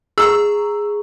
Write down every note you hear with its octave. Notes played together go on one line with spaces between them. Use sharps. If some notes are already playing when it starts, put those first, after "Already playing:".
G#4 A#5 C#6 E6